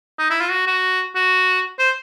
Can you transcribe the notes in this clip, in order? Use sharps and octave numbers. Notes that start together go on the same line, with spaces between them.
D#4
E4
F4
F#4
F#4
F#4
C5